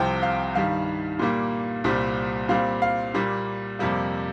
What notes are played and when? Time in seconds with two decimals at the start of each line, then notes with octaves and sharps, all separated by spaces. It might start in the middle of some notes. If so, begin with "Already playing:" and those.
Already playing: C2 C3 F3 G5
0.23 F5
0.55 G2 D#3 G3 F5
1.19 A#2 G3 A#3
1.84 C2 A#2 G3 C4
2.49 A#2 G3 C4 F5
2.82 F5
3.14 A#2 G3 A#3
3.79 F2 C3 G3 A#3